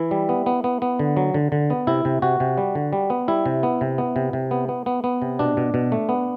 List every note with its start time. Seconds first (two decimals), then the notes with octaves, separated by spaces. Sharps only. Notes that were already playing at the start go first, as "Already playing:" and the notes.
Already playing: E3 E4
0.11 G3
0.29 B3
0.46 B3
0.64 B3
0.82 B3
0.99 D3
1.17 F#3
1.34 D3
1.52 D3
1.70 B3
1.87 C3 E4
2.05 C3
2.22 C3 F#4
2.40 C3
2.58 G3
2.75 D3
2.93 G3
3.10 B3
3.28 G3 E4
3.46 C3
3.63 B3
3.81 C3
3.98 B3
4.16 C3
4.33 C3
4.51 B3
4.69 B3
4.86 B3
5.04 B3
5.22 C3
5.39 B2 D4
5.57 B2
5.74 B2
5.92 A3
6.09 B3